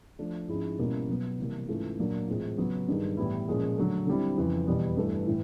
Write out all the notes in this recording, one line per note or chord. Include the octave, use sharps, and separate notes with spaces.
F3 A3 D4
G#2 F3 G#3 C#4 E4
B2 G3 A#3 C#4 E4
B2 F#3 B3
C3 E3 G3 A#3
G#2 E3 A3 C#4 F4
A#2 F#3 A#3 D4
A2 E3 G#3 C4 F4
C#3 F#3 B3
G2 D#3 G#3
A2 E3 G3 B3 E4
A#2 F3 G#3 C#4
D3 F#3 A3
D3 G3 C4 E4
F2 C#3 E3
E2 B2 G3 B3
G2 E3 A3
A2 E3